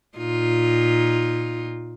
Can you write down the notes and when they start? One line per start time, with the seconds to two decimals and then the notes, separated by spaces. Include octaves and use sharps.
0.18 A#2 D#4 F4